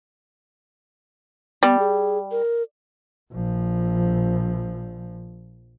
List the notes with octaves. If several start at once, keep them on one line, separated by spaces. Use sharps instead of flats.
G3 B3
G#4
A#4
A#1 F3